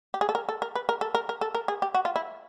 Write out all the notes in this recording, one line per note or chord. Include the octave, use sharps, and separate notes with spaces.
G4
G#4
A4
A#4
A4
A#4
B4
A#4
A4
A#4
A#4
A4
A#4
G#4
G4
F#4
F4
E4